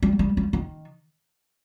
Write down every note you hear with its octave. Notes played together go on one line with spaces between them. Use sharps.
G3
G3
G3
D#3